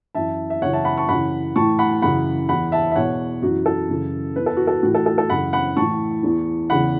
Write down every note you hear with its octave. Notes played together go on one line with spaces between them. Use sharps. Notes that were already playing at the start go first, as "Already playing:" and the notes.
F#2 E3 E5 A5
E5
F#2 C#3 E3 C#5 F#5
E5 A5
F#5 B5
A5 C#6
F#2 C#3 E3 F#5 B5
A2 E3 A5 C#6
F#5 B5
F#2 C#3 E3 F#5 B5
E2 E3 F#5 B5
E5 A5
E5
E2 B2 C#5 F#5
F#2 E3 F#4
A4
F#2 C#3 E3
E2 E3 B4
A4
F#4
A4
A2 E3 F#4
A4
A4
A4
F#2 C#3 E3 F#5 B5
F#5 B5
A2 E3 A5 C#6
E2 E3
E2 C#3 E3 F#5 B5